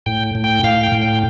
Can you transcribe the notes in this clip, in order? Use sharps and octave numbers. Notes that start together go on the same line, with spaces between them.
A2 G5
A2
G5
A2 F5
G5
A2
G5